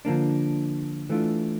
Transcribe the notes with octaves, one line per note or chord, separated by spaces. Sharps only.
D3 F3 A#3 D4
E3 A3 D4 F4